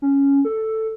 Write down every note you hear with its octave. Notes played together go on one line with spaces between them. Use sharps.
C#4
A4